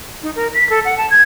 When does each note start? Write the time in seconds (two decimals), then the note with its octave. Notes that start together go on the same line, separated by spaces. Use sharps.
0.22 D#4
0.36 A#4
0.54 B6
0.69 A4
0.85 F#5
0.97 A5
1.10 G#6